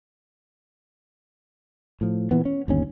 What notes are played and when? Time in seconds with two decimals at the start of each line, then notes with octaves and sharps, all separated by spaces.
2.01 A2 F3
2.31 A#2 E3 B3
2.45 C#4
2.68 G1 D#2 C#4